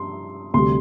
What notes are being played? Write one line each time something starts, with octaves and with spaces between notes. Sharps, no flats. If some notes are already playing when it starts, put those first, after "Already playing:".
Already playing: G2 C6
D2 C3 G3 C6